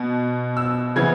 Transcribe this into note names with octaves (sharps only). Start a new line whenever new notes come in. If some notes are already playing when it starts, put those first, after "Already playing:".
Already playing: B2
E6
C#3 E3 B3 G#6